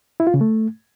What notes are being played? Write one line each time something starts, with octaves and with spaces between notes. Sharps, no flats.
E4
F4
C#3
A3